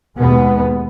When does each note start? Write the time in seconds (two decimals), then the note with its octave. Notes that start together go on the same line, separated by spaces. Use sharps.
0.17 D#2 B2 G#3 B3